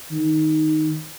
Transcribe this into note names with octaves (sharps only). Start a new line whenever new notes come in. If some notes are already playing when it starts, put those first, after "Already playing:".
D#3